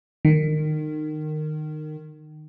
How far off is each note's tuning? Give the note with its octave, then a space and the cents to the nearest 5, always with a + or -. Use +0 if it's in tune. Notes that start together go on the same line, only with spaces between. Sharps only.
D#3 -20